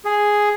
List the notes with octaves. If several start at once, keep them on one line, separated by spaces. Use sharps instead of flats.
G#4